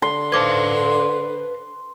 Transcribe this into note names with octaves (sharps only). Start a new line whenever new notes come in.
D3 C6
B4 C5 F5 A5 D6 G#6